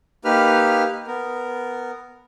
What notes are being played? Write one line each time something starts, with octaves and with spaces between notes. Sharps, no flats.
A#3 D#4 G4 B4 F6
B3 A#4